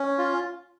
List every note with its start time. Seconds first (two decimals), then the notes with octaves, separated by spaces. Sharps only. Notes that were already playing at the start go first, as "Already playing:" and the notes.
Already playing: C#4
0.18 F4